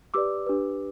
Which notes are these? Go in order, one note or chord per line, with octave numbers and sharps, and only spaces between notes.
G4 B4 D5 D6 E6
D4 G4 B4